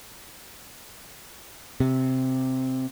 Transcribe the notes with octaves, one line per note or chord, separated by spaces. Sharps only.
C3